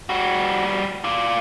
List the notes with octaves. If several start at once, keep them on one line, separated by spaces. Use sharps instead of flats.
G3 F#4
F4 D5